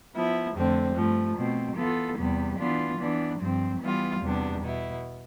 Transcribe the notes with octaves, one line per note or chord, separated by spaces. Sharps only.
F3 B3 E4
F2 D3 A3 C4
G2 F3 A3
B2 A3 C4
E3 B3 F4 A4
E2 C3 G3 B3
E3 B3 D4 F4
E3 B3 D4
G2 F3 C4
E3 G3 B3 F4
E2 C3 G3 B3 D4
B2 B3 E4